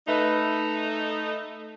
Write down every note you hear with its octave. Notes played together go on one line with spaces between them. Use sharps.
A3 D#4 B4 E5